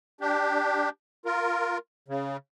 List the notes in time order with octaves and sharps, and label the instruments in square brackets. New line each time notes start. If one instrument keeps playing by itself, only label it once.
[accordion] D4 G4
F4 A#4
C#3